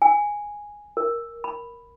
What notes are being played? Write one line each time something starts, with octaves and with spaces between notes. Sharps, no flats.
G#5
A#4
B5